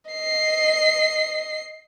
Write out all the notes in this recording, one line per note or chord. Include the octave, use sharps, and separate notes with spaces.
D#5 C7